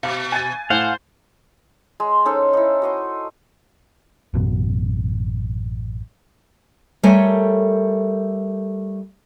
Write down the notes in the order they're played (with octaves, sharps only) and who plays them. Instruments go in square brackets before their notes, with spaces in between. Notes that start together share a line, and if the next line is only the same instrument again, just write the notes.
[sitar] B2 [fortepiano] F5 D6
[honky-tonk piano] G#5 A6
[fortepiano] A2 [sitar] C5 [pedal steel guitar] F5 F#5
[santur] G#3
C#4 D#4 A4 C5
D#4 E4
F#4 D#5 C6
[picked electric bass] A1 F#2 B2
[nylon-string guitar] G3 A3 A4 A#4 C#5 G#5